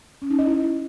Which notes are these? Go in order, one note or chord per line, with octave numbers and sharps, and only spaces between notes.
C#4
D#4
D#5
E4